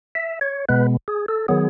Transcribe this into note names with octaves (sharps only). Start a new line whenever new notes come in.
E5
C#5
B2 G#3 B3 B4
G#4
A4
D#3 F#3 B3 G#4